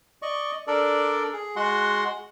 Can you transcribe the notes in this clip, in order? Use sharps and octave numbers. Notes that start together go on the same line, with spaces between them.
D5 D#5 C#6
D4 A4 A#4 D5
G#4
G#3 F#4 F#5 C6